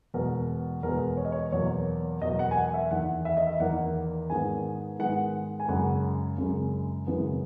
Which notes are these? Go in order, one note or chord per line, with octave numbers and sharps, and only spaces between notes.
E2 B2 G#3 B3 A#4
E2 B2 G#3 B3 A#4
C#5
D#5
C#5
E2 B2 F#3 A#3 C#5
E2 B2 F#3 A#3 D#5
F#5
G#5
F#5
E5
E2 D#3 A#3 F#5
E5
D#5
E5
E2 D#3 A#3 F#5
G#2 D#3 G#3 B3 G#5
G#2 D#3 G#3 B3 F#5
G#5
F#2 C#3 G#3 F#5
F#2 C#3 G#3
F#2 C#3 E3 G#3 B3